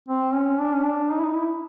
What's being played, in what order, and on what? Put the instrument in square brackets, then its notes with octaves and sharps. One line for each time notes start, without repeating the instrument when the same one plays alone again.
[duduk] C4
C#4
D4
C#4
D4
D#4
E4
D#4
E4